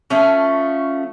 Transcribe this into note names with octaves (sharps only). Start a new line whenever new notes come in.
F3 A3 C#4